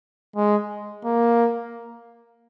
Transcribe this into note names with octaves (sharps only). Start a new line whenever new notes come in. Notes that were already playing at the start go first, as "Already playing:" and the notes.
G#3
A#3